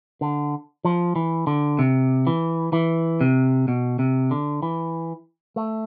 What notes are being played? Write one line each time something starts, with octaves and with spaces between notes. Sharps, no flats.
D3
F3
E3
D3
C3
E3
E3
C3
B2
C3
D3
E3
A3